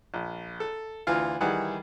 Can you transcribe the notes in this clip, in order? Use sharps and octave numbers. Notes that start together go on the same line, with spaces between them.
A#1
A4
D2 E3 F4 F5
D#3 E3 G3 G#4 F#5